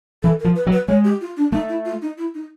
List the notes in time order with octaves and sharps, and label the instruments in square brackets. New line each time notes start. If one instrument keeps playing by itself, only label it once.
[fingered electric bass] E3 [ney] A4
[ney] A#4
[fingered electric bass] F3
[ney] B4
[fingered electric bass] F#3
[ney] B4
[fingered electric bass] G#3 [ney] C#5
[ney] G4
F4
D4
[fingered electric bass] A3 [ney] D#4
[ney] E4
F4
D#4
E4
D#4